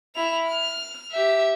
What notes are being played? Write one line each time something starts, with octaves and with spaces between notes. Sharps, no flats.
E4 F7
F6
G4 E5